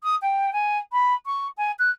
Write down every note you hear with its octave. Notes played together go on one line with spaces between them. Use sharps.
D#6
G5
G#5
B5
C#6
G#5
F#6